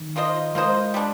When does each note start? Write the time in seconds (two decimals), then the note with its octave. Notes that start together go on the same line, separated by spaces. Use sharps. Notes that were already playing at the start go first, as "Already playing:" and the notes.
Already playing: D#3
0.16 A#3 F4 C5 D#5
0.55 G#3 A#3 F4 C5 D#5
0.94 G3 D4